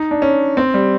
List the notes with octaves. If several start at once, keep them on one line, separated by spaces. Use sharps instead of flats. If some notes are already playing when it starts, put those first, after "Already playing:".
Already playing: D#4
D4
C#4
C4
G3